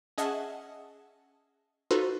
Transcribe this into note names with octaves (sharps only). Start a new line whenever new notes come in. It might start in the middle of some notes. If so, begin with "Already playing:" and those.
C#4 G#4 D#5 E5 F#5 A5
D#4 F4 F#4 A4 B4 C5